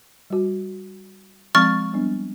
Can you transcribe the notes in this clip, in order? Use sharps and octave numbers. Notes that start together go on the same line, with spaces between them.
G3 F#4
F3 G#3 C4 C#6 F6 A6
G3 B3 D4